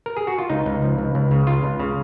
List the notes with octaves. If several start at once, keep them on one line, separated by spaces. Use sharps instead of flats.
A#4
G#4
F#4
F4
C#2 D#4
C#2
F3
C#2
C#2
C#3
C#2 F4
C#2
C#3